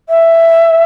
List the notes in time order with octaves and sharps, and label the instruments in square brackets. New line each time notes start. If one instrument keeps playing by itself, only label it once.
[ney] E5